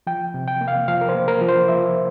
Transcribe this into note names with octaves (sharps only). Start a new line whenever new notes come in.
F3 G5
C3
G5
A#3
F5
F3 F5
A#4
C5
A#3
A#4
F3
C5
F3 E5